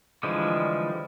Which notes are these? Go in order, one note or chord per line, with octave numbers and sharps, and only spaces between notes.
D3 E3 F3 G3 G#3